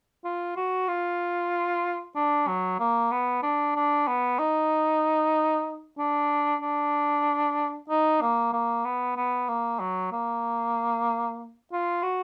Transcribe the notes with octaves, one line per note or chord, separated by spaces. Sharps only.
F4
F#4
F4
D4
F#3
A#3
B3
D4
D4
B3
D#4
D4
D4
D#4
A#3
A#3
B3
B3
A#3
F#3
A#3
F4
F#4